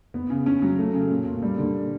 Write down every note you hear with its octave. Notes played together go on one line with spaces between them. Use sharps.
B3
C#3
C#4
F#3
A3
C#3
A#2
A#2
G3
D3